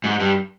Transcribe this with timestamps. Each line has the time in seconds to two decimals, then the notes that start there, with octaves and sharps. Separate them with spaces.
0.04 G#2
0.20 G2